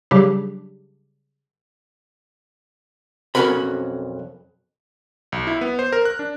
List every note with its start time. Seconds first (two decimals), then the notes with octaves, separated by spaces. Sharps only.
0.11 C#3 F#3 G3 D4 G4
3.35 B1 F2 C#4 F#4 A#4 B5
5.32 B1
5.47 E4
5.61 B3
5.79 C5
5.92 A#4
6.05 F#6
6.19 D4